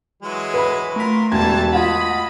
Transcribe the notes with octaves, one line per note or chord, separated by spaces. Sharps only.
E3 F#3 G#3
B4 B5
A3 F4 A#4 B6
E1 D3 E3 G3 A5 G#6
F4 D#5 F5 F#5 B5